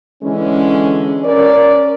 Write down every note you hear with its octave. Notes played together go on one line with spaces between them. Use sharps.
D3 E3 G#3 C#4
C#4 A#4 D5